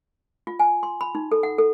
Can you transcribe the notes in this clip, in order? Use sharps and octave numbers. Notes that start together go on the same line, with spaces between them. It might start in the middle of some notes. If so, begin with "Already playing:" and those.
F4
G#5
C6
B5
D#4
A4
F#5
A4